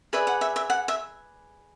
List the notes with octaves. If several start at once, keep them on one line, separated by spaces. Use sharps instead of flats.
G#4 B4 D5 E5
F#5
E5
E5
F#5
E5